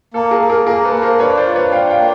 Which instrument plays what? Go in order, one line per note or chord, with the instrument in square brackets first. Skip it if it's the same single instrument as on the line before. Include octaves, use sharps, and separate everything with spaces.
[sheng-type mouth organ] A#3 [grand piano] A4
[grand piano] G#4 A#4
[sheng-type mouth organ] A#3
[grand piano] G#4 A#4
[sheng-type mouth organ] A#3 [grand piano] G#4 A#4
[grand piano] A4 B4
[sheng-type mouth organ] A#3
[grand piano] A#4 C5
[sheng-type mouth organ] D4 [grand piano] B4 C#5
[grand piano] C5 D5
[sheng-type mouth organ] F4
[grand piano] B4 C#5
[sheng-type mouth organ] D4 [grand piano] F5 G5
[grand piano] F5 G5
[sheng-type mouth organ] A#3